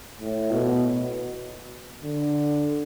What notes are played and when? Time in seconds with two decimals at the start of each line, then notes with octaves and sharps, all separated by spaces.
0.20 A2
0.51 B2
2.03 D3